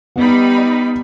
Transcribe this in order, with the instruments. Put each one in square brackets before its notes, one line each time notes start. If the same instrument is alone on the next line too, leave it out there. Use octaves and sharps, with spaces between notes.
[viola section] G3 D#4 B5 [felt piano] B3